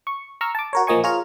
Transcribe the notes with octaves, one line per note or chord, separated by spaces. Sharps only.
C#6
A#5 C#6 E6 F6
A5 D6
F#4 A#4 C#5
A#2 F3 A#3 D#5 G#5 C#6
F4 G#4 C#5 A#5 F6